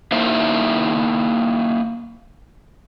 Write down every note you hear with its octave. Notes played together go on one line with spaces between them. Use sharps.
A#3 D#4 E4 C5 E5